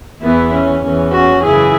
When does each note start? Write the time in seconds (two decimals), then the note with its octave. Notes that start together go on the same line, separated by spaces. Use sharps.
0.22 E2 E3 B3 E4
0.53 C#4
0.83 E2 E3 C#4
1.13 C#4 F#4
1.45 F#2 C#3 E3 E4 G#4